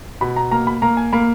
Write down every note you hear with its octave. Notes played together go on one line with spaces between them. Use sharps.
B2 B5
A#5
A#3 A#5
B5
A#3 A#5
G#5
A#3 B5